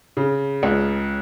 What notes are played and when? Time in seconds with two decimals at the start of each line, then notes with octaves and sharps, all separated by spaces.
0.17 C#3
0.63 C#2